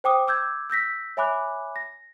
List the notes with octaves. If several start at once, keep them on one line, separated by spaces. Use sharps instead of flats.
C5 G5 D6 D#6
D6 E6 G6 G#6
E6 G6 A#6 B6
C#5 E5 G#5 B5 D6 F#6
A#6